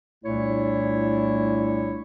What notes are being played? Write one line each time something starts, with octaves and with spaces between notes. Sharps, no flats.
C2 A#2 A3 D4 E4 C#5